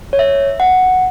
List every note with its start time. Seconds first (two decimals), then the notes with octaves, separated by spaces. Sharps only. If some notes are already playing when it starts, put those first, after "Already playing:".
0.13 C#5
0.19 E5
0.60 F#5